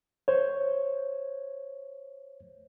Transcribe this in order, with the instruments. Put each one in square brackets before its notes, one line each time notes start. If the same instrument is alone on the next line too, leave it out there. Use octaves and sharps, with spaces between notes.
[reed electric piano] C5 C#5